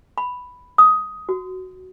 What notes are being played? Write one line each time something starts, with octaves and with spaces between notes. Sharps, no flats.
B5
D#6
F#4